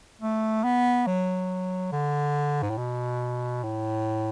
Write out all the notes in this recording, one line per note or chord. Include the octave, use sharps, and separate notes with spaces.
A3
B3
F#3
D3
G#2
A2
B2
A2